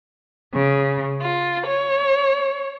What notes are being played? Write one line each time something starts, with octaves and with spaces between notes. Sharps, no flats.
C#3
F4
C#5